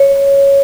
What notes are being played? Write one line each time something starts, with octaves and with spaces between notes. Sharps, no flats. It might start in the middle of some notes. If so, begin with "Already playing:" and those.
Already playing: C#5